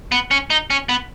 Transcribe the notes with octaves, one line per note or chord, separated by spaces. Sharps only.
B3
C#4
D#4
C#4
B3